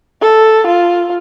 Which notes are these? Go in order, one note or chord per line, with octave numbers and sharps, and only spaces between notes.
A4
F4